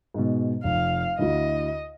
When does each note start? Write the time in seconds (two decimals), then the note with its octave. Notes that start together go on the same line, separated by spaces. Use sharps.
0.14 G#2 B2
0.64 F1 F5
1.19 D2 E4 F#4 D#5